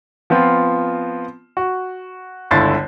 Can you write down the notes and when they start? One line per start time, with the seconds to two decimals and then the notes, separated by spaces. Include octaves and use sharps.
0.30 F3 B3 C4 F4
1.57 F#4
2.51 G1 C#2 D3 E4 A6 C7